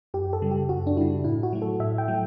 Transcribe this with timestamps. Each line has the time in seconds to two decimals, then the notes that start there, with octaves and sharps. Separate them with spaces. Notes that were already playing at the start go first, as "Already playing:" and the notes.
0.14 F#2 G4
0.33 A4
0.42 C#3 G3
0.51 G4
0.69 F#2 F#4
0.87 D4
0.97 C#3 G3 E4
1.24 A2 E4
1.43 F#4
1.53 F#3 A3
1.62 A4
1.80 A2 E5
1.98 G5
2.08 F#3 A3